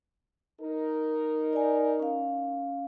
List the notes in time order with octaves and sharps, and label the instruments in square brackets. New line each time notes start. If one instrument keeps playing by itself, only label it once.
[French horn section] D#4 A#4
[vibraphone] D5 G#5
C#4 F5